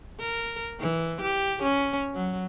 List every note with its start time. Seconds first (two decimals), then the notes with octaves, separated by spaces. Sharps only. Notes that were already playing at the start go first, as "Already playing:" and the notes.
0.20 A#4
0.80 E3
1.21 G4
1.62 C#4
2.14 F#3